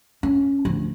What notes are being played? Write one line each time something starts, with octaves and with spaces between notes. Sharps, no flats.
C#4
D2 F3